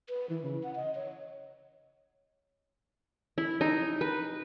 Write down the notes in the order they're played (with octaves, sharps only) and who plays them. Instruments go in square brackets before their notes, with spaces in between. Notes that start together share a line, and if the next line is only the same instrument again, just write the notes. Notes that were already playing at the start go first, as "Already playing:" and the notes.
[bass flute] B4
E3
C#3
F#5
D#5
C#5
[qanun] E4
D#4
B4